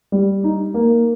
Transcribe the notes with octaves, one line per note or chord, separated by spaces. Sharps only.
G3
D#4
A#3